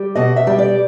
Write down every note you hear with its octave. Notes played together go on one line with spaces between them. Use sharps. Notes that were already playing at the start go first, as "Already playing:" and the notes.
Already playing: G3
B2 D#5
E5
G3
D5